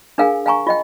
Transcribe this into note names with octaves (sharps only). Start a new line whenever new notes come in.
D4 G#4 A#4 F5 G5 G#5
F5 G5 G#5 A#5 C#6
F4 D#5 G5